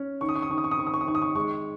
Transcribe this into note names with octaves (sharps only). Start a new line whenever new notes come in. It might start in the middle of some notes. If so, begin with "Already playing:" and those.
Already playing: C#4
D#3 C#6
D#6
C#6
D#6
D#3 C#6
D#6
C#6
D#6
D#3 C#6
D#6
C#6
D#6
D#3 C#6
D#6
C#6
G#3 C#6